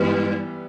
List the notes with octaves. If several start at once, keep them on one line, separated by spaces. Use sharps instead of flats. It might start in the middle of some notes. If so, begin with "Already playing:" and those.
Already playing: G2 E3 G3 B3